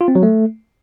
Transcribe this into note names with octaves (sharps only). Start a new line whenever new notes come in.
F4
C4
F#3
A3